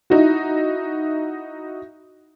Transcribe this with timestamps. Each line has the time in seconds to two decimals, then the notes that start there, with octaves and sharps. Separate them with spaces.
0.10 D#4 E4 F#4